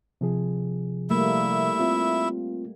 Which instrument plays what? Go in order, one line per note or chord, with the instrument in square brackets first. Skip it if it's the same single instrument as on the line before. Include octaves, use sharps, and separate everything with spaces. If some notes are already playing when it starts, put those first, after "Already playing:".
[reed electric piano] C3 F3 G#4
[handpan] G3 A3 A#3 [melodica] E4 E5
[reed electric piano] C4 F4